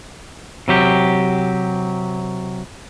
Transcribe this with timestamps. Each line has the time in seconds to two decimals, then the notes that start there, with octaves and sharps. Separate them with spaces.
0.68 C3 F#3 G4